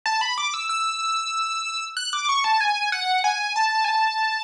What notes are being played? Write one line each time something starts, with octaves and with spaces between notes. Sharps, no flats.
A5
B5
D6
E6
E6
F#6
D6
C#6
A5
G#5
F#5
G#5
A5
G#5
A5